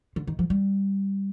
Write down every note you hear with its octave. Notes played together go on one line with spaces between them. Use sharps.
D3
D#3
F3
G3